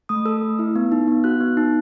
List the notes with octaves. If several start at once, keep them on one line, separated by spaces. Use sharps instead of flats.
A3 D#6
A4 E6
A3
E4
B3
D#4
B3
F#4 F#6
B3
D#4